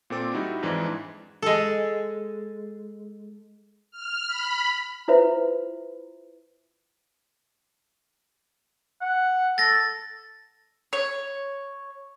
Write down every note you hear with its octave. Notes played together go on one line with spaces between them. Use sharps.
A#2 C4 A4 D6 A6
G3 D#4 E4 F#4
F2 G#2 E3 D4
G#3 A4
F6
B5
E4 F4 B4 C5 E5
F#5
A4 A6 A#6
C#5